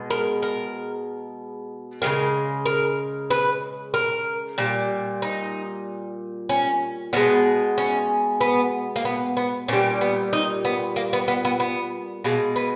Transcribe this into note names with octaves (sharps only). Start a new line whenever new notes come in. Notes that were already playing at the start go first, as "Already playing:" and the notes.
Already playing: B2 G#3
A#4
A#4
C#3 E3 G#3 A#4
A#4
B4
A#4
A#2 G3
D#4
C#4
B2 G#3 B3
C#4
B3
A#3
B3
B3
A#2 G3 C#4
B3
D#4
B3
A#3
B3
B3
B3
B3
B2 G#3 A#3
B3